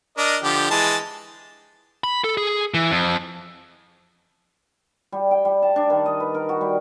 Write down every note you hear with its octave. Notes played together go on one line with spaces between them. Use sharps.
D4 A#4 D#5
D3 F3 G4
E3 G#3 A5
B5
A4
G#4
E3
F2
G3
G5
G3
A5
D4
D#3
D#5
B4
A#4
F#4
G3